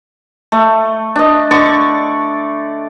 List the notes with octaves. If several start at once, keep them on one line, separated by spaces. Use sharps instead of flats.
A3
D4 D#5
D3 D5 C#6